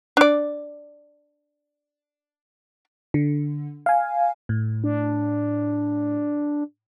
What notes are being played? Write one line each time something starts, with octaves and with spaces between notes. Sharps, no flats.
D4 D5
D3
F5 G#5
A2
D4